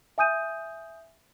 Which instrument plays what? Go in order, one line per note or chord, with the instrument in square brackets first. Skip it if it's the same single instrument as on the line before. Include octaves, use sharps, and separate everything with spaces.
[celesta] E5 G#5 D#6 G6 D#7